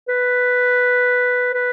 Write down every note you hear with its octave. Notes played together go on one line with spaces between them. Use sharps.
B4
B4